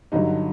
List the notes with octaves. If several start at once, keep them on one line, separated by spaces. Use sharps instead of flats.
G2 D3 F#3 D#4